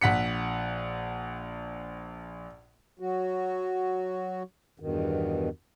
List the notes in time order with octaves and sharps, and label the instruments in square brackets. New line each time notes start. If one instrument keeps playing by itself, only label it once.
[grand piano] A#1 F#5 B6 C#7
[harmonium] F#3 F#4
E2 G2 B2 D#3